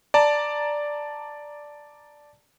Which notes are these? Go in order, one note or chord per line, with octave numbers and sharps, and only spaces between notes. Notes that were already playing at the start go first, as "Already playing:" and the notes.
D5 A5 A#5